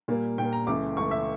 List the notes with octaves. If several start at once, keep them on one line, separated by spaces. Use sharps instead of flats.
A#2 G3 A#3
A#2 G3 A#3 G5
A#5
C#2 C#3 E3 A3 D6
C#2 C#3 E3 A3 C#6
E5